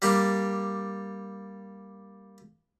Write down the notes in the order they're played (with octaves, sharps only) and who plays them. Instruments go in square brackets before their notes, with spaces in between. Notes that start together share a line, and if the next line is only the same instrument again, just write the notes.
[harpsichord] G3 A#3 D4 G4